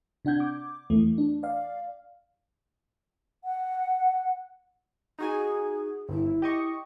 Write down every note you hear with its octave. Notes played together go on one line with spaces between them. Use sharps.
C3 D4 F#5 G6 G#6
D6
E2 E3 A3
D4
D5 F5
F#5
D#4 F#4 G#4 G#5
G1 E4
G4 D#5 C#6